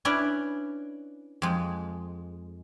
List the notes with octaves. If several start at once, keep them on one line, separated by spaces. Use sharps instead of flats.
C#4 D4 E4 B4 D5
F2 G#3